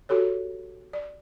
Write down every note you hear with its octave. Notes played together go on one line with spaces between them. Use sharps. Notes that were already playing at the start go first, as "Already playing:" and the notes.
F#4 G4 A4 C#5
D5